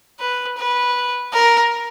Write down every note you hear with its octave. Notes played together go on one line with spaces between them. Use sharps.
B4
B4
A#4